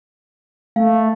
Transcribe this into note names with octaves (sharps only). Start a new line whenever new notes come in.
A3 F5